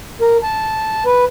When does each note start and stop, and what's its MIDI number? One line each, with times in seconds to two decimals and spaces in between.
0.21 0.37 70
0.43 1.04 81
1.06 1.25 71